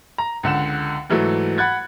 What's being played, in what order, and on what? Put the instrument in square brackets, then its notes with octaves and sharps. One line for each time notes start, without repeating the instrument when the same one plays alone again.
[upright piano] A#5
C#2 D3 F#5 E7
G#2 E3 F#3 A3
F#5 B5 F#6 G#6 A6